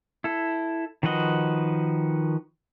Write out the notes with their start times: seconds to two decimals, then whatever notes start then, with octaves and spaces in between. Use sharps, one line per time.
0.24 E4 A4
1.03 D#3 F3 F#4 B4 D#5